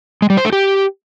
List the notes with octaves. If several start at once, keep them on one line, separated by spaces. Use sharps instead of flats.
G#3
G3
C5
A3
G4